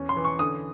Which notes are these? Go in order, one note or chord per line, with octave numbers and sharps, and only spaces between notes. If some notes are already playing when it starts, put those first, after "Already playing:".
Already playing: E2 C#4
C6
E3
C#6
D3 D#6